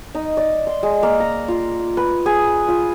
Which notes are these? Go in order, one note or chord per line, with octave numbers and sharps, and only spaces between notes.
D#4
D5
C6
G#3
A#3
A#5
F4
B4
G#4
F4